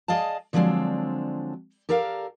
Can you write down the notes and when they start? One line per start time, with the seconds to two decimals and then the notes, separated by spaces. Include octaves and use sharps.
0.08 G#4 D5 D#5 F5 A5
0.53 D3 F3 F#3 G#3 C4 D4
1.89 G4 A4 A#4 D5 F5